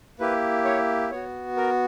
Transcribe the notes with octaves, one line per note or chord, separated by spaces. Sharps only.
A#3 E4 G4 B4
C#5
B3 F#4 C#5
A#4